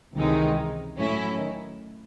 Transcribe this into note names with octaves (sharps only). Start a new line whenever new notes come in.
C#2 C3 D#3 E3 G#3 D#4
A2 F#3 C#4 E4
D#3